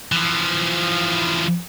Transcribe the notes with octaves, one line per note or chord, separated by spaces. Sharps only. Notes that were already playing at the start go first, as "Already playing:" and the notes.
E3 F3